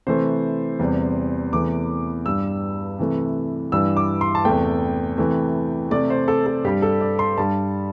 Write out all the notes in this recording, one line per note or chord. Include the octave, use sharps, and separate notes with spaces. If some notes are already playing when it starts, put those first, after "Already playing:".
C3 E3 A3 C5
E2 C3 G3
E2 C3 E3 A3 D6
G2 G3 E6
C3 E3 A3
G2 E3 G3 E6
D6
C6
A5
E2 C3 A3 G5
C3 E3 A3
C3 A3 D5
C5
A4
A4
G2 G3 G4
A4
D5
C6
G2 G3 A5